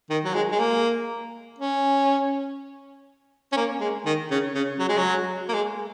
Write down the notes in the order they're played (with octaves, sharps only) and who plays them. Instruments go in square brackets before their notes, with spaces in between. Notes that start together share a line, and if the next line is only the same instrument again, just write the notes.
[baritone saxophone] D#3
F#3
G#3
G#3
A#3
C#4
C#4
A#3
G#3
D#3
C#3
C#3
F#3
G#3
F#3
A#3
G#3